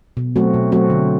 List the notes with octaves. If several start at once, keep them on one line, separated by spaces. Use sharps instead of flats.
B2
F#3 A3 C4 F#4
B2
F#3 A3 C4 F#4
D3